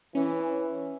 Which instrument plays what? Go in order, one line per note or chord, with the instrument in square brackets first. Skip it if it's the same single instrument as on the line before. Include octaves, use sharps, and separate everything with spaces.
[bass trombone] E3 [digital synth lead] C#4